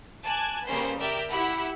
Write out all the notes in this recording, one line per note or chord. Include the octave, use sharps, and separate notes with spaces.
G#5 A5 D6 F#6 G#6
C#3 G3 A#3 C#4 B4 C5
G4 A#4 D5 E5
E4 G4 E5 F#5 B5